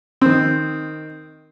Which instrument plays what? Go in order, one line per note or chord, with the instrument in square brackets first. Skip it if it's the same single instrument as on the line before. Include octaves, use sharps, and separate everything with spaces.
[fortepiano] D#3 C4